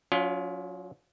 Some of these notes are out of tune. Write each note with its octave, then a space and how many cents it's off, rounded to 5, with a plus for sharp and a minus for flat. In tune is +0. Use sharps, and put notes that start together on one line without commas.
F#3 -25 C#4 +35 F4 +0